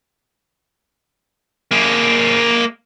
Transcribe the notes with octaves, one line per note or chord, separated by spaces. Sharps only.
A#3 G#4